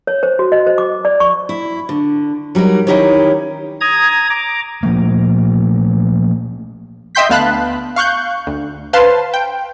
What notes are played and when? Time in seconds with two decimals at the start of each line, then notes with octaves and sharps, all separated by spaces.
0.07 C#5
0.23 C5
0.39 F#4
0.52 D#5
0.67 C5
0.78 D6
1.05 D5
1.20 C#6
1.49 E4
1.89 D3
2.55 F#3 G3 D#4 A#4
2.87 D#3 C#4 D#4 E4 G4 C#5
3.81 A#5 D#6 G#6
4.30 A#5 D6
4.83 A#2 F3 A3 A#3
7.15 D#5 E5 G5 C6 G6 B6
7.29 D2 B3 F5 A5 B5 F#6
7.96 F5 C#6 F#6 G6
8.47 D2
8.93 B4 C5 F5 A5 C6
9.34 G5